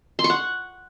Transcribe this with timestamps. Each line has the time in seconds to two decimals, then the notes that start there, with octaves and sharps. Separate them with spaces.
0.19 C6
0.24 C#6
0.30 F#5